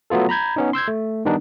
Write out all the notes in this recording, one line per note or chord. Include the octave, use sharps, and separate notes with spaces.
F#3 A3 B3 F4 A4
A#5 B5 G6 G#6
B3 C#4 D#4
C6 E6 G6 G#6
A3
D#3 G3 B3 D4 D#4